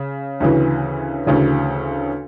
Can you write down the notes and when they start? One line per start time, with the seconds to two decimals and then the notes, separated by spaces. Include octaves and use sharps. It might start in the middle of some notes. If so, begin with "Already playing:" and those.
Already playing: C#3
0.40 D2 C#3 E3
1.26 D2 C#3 E3